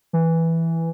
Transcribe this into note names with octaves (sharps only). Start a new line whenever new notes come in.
E3